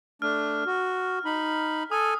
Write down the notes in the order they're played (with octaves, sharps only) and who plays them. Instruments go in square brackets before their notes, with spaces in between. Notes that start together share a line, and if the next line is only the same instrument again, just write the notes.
[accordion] A3 D4 [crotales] F6
[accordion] F#4
D#4 B5
[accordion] A4 G#5 [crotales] D#6